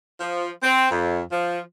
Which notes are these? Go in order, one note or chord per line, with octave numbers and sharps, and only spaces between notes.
F3
C4
F2
F3